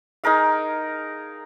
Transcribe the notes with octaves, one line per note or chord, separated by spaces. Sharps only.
D#4 G#4 A#4 F5